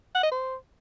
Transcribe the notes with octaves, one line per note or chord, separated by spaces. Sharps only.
F#5
D#5
C5